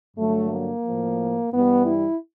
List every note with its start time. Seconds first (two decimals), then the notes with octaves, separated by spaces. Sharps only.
0.16 G2 D3 F#3 A3
0.51 A#3
0.85 A2 F3
1.53 G2 E3 G3 B3
1.86 E4